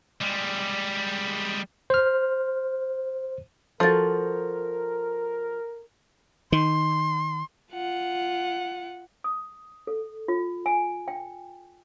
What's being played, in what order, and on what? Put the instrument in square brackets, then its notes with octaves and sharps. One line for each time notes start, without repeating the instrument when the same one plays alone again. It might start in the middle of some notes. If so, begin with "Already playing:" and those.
[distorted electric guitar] G3 G#3
[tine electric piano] C5 F6
[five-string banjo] F3 F#4 [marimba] A4 A6 [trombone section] A#4
[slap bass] D#3 [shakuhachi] C6
[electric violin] F4 F#5
[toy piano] D#6
A4
F4
G#5
G5